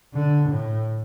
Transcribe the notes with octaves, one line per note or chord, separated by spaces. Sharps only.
D3
A2